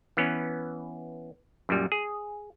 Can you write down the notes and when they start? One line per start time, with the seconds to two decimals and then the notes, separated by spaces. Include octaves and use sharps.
0.17 E3 B3 C#4
1.69 F#2 A#2 G3
1.92 G#4